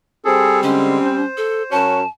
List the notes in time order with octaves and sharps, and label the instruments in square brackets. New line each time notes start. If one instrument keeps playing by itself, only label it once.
[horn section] G3 C4 [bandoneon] G#4 A4
[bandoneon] D3 G#3 [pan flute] C#4
[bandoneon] C5
[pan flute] A4
[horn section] F#2 C#4 F#4 [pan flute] A5